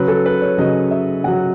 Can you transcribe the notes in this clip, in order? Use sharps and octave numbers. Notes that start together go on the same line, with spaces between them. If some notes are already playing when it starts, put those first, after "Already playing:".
Already playing: C#3 F#3 B4
A4
B4
C#5
C#3 F#3 D#5
E5
C#3 F#3 F#5